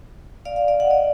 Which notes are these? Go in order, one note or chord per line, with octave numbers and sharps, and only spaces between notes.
D5 F5
D5 F5
D5 F5
D#5 F#5
D5 F5